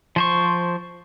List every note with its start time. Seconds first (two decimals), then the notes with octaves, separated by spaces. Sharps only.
0.16 F3 C5 C#6